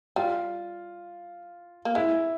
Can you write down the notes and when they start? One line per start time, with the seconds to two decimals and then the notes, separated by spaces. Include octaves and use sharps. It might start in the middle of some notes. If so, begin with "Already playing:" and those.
0.16 G3 F4
1.85 A#3
1.95 G#3 E4